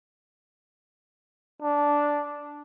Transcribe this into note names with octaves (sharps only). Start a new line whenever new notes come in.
D4